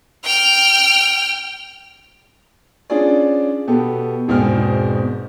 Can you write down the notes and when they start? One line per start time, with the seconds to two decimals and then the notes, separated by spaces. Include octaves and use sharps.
0.24 G5 F6
2.90 C#4 D4 F4 G#4 D5
3.67 B2 B3 G4 A4
4.28 E1 G#2 B2 C4 G#5 F6